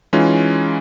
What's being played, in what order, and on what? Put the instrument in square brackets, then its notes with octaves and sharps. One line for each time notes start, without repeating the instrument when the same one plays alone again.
[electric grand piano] E3 G#3 C#4 D#4 F4